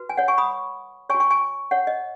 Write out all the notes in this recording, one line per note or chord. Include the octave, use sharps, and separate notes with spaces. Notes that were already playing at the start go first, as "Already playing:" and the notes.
Already playing: F#4 B4
G#5
C#5 F#5
G#5 C#6
B5 D#6
F#4 C#5 G#5 C#6
G#5 C#6
G#5 C#6
C#5 F#5
D#5